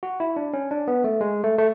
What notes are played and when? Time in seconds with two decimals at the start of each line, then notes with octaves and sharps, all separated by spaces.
0.03 F#4
0.20 E4
0.36 D4
0.53 C#4
0.71 D4
0.88 B3
1.04 A3
1.21 G#3
1.44 A3
1.58 A3